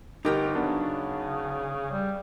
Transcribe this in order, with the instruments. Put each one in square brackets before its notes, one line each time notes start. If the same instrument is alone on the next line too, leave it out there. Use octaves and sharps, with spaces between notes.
[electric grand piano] G1 G4 [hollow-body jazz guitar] D#4 A#4 G5
[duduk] C#3 [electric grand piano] F#3 B3 D4
[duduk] G3